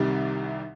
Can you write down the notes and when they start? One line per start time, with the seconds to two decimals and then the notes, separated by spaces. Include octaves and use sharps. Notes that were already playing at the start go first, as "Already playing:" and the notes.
Already playing: C2 C3 D#3 G3